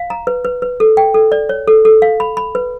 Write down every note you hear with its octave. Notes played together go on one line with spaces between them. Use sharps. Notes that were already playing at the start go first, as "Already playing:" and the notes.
Already playing: F5
A#5
B4
B4
B4
A4
G5
A4
D5
C#5
A4
A4
F5
B5
B5
B4